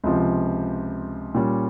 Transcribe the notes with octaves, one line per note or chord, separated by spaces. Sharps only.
C#2 C3 F3
A#2 G3 C#4